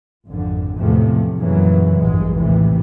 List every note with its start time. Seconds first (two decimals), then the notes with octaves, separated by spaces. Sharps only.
0.27 G#1 F2 D3
0.77 E2 A2 C3 F3 A3
1.36 F#2 A#2 C#3 E3 F#3
1.97 A#1 E2 G2 G#3
2.36 D#2 A2 C3 E3